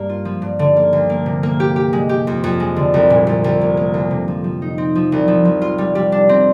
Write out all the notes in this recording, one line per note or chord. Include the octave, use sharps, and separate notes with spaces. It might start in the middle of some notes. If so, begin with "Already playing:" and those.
Already playing: G2 A#3
F4
F3
G2
D3
A#3
D2
A#3
C3
A#3
G4
G4
G#3
G4
F2
F2
G#3
D3
C2
A#2
C2
C2
A#3
A#3
D2
C3
F3
F3
D#4
C4
F3
C2
F3
F3
F4
G3
G3
D4
C4